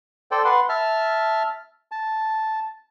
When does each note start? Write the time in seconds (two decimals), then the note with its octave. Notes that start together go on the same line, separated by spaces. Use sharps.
0.31 A4 C5 D5 G5
0.45 B4 F#5 C6
0.69 E5 A5 F6
1.91 A5